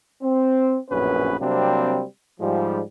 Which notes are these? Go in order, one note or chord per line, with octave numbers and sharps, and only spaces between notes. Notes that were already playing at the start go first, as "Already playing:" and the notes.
C4
A#1 F#2 A2 B3 C#4 B4
C3 F#3 G3 A#3 C4 D4
G#2 F3 G3